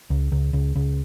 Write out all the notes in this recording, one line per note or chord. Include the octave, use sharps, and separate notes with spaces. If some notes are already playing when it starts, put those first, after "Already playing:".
C#2
C#2
C#2
C#2